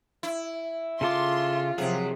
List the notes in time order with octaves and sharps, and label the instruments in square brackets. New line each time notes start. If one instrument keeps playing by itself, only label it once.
[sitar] E4
[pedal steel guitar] C#3 A4 D6 [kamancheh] F4 [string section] C6
[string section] C3 D#3 F3 [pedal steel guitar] F#3 [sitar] G#4